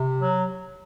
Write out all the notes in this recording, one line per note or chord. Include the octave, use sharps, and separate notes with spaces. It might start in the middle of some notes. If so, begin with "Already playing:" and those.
Already playing: C3
F#3